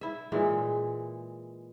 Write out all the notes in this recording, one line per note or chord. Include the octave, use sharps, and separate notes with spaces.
E4 E5
A#2 E3 G#3